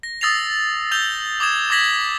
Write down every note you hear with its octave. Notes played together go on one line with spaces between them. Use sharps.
A#6
D#6 E6 A6 A#6 C7 F7
E6 G6 F7 G7
D6 D#6 G#6 E7
D6 G6 G#6 A#6 B6 F#7